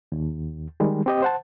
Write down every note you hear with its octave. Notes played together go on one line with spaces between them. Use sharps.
D#2
D#3 G3 G#3
C4 G4 D#5
C5 F#5 A5